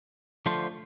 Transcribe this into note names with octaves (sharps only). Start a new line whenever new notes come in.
D3 F3 A3 F4 C5